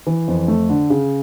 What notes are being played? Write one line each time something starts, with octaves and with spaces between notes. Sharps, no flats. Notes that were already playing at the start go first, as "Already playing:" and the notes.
E3
F2
A3
D3
C#3